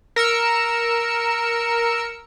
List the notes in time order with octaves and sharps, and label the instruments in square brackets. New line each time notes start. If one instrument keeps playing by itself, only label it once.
[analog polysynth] A#4 E6 C#7